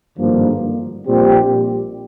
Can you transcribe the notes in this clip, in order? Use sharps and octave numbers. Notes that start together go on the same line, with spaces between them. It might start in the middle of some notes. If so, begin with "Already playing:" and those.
G#1 G2 D3 F3 A#3
A#1 A#2 G3 C4 G4